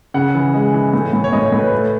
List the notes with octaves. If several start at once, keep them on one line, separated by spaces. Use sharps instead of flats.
C#3 F#5
E3
G#3
E3
A2
A2
C#5
A2 D#5
C#5
A2
B4
A3